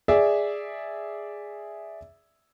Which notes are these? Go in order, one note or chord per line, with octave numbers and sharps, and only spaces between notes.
G#4 D5 E5